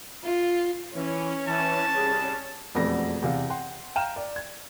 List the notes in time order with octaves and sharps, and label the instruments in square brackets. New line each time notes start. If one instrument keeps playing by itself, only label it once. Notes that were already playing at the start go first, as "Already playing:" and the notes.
[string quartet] F4
[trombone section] E3 [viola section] C#4
[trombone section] E3 [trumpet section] D4 A5
[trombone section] C2 G3 G#4
[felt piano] E1 F2 A3 B3 D5 A#6
E2 C3 F5
F#5 G5 C6
F5 G5 A#5 F6 E7
D5
G#6